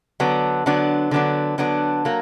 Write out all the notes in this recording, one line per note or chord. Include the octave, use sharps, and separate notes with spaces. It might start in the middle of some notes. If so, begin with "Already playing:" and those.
D3 F#3 B3 D4
D3 F#3 B3 D4
D3 F#3 B3 D4
D3 F#3 B3 D4
F#3 A#3